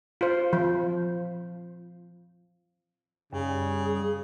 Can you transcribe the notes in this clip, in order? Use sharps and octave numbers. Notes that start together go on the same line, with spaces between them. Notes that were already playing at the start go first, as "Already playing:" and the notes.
F4 C5
F3
F#2 C#3 G3 G#4